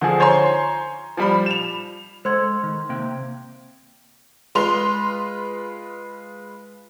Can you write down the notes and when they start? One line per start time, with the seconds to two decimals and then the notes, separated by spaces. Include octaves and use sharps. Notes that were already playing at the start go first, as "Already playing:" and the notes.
0.01 D3 F3 G#4
0.20 C5 C#5 G#5 A#5 C6
1.17 F3 G3 B5
1.46 E7 F7
2.25 G#3 A4 C5 F#5 C6 G#6
2.63 D#3
2.89 C3 A#3 G5
4.55 G#3 F4 B4 C6 F7